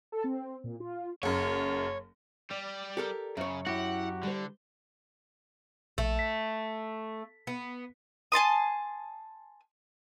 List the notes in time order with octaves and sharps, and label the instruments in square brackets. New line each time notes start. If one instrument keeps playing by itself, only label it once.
[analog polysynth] A4
C4
A#2
F4
[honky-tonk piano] F#1 F#2 [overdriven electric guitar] C#5
[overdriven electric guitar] G3 [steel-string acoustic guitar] D5
[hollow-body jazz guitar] G4 A4 A#4
[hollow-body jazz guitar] F#2 C#5 [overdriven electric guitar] C#3
[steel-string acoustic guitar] E4 [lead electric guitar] F#4 G4 [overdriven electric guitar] F#5
[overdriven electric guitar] D3 [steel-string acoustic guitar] G3 C5
[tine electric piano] A#1 [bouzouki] A3
[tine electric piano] B6
[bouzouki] B3
[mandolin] G#5 A5 C6 D#6